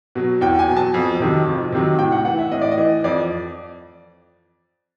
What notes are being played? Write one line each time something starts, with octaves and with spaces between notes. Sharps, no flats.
B2 F#3
E2 G5
G#5
B2 F#3
A5
F2
C3 D#3 F#3
F2
C3 D#3 F#3
A2 G5
F#5
E3 F#5
E5
A2 D#5
D5
D#5
E3
F2 D5